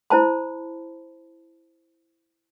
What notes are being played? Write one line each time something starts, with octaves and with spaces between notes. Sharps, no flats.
E4 C5 A5 B5